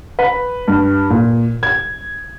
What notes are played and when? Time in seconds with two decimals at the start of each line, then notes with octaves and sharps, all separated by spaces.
0.19 B4
0.68 G2
1.10 A#2
1.63 G#6